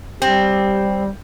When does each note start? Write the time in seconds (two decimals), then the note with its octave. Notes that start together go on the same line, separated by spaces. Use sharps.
0.22 G3 C4 G4